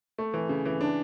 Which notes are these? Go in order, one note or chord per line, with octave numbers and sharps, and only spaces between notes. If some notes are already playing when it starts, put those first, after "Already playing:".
A3
E3
C#3
E3
D4